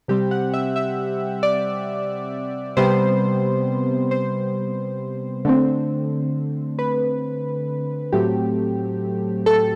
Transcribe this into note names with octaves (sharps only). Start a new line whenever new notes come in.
C3 G3 C4 G4
F#5
E5
E5
D5
C3 G3 B3 C5
C5
D3 A3 C4
B4
A2 F#3 A3 C4 G4
A4